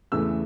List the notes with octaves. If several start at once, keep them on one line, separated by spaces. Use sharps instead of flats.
E2 C#3 E3 A3 E6